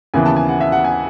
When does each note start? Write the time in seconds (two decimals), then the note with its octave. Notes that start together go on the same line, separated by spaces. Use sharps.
0.14 D#2 C#3 E3 B3 G#5
0.25 A5
0.36 G#5
0.49 F#5
0.61 E5
0.72 F#5
0.84 G#5